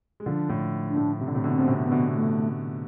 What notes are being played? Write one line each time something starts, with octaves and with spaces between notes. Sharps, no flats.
G#3
D3 F3 D4
A2
D4
A2
C3
D3
A2 C3
B2 D3
C4
B2
A2 C3
B3
B2 D3
A3